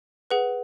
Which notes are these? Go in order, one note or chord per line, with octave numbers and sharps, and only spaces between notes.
G#4 B4 F#5